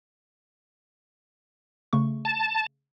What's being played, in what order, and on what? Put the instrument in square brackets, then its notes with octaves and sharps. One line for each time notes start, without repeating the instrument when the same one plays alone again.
[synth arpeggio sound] C#3 A3 C#6
[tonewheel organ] A5